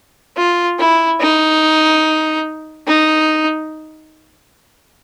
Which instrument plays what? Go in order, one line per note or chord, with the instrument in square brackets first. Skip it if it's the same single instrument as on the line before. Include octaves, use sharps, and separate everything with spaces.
[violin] F4
E4
D#4
D#4